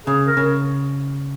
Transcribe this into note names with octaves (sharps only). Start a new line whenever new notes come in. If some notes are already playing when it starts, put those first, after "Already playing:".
C#3 G#4
A#4
C#3